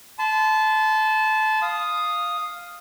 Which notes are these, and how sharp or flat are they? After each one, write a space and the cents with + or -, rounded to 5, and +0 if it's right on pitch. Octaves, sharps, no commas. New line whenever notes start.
A5 -20 C6 -40
F5 +0 D#6 +0